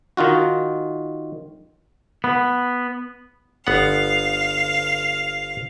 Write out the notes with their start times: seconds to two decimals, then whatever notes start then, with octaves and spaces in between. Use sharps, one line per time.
0.17 D#3 D#4 F4 F#4
2.24 B3
3.67 G1 B3 F5 F#5